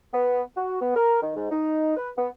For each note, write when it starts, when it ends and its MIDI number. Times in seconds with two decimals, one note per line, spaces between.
0.12 0.40 59
0.56 0.80 66
0.81 0.93 59
0.95 1.19 70
1.21 1.35 51
1.35 1.46 44
1.50 1.95 63
1.96 2.09 71
2.16 2.28 59